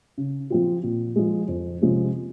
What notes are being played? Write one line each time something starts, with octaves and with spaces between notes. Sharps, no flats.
C#3
F3 C4 F4
A#2
F3 G#3
F2
C3 F3 G#3 C#4